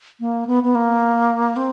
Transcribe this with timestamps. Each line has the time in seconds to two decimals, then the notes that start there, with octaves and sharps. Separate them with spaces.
0.20 A#3
0.47 B3
0.63 B3
0.75 A#3
1.56 C4